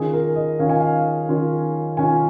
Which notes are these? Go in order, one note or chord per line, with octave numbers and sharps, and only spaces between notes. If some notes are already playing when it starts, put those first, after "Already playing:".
Already playing: D#3 C#4 F4 G#4
A#4
D#5
D#3 C#4 F4 F5
G#5
F5
D#3 C#4 F4
D#3 C#4 F4 G#5